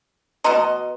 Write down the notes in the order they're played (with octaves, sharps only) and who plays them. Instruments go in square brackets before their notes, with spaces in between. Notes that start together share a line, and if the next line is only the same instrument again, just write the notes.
[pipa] B2 D#5 [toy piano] A#5 C6